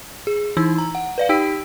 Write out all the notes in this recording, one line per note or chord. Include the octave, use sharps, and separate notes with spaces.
G#4
E3 D#4 E4 E6
A#5
F#5
B4 D5 F5
D#4 G4 G5 E6 B6 D7